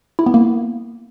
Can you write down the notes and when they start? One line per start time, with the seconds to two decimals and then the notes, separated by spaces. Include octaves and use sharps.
0.19 E4
0.26 B3
0.34 A#3